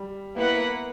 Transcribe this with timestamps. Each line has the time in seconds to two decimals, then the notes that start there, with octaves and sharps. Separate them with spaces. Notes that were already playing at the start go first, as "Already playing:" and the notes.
Already playing: G3
0.36 A#3 B3 E4 B4 F#5